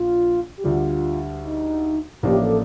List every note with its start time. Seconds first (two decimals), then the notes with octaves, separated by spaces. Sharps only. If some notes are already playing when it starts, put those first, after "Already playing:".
Already playing: A#1 A#2 F4
0.58 G4
0.64 D2 D3 G3 F4
1.43 D#4
2.23 A1 A2 F3 A#3 D4 G4
2.43 A4